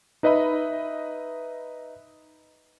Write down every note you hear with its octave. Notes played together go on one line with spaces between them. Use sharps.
D#4 B4 D#5 E5 B5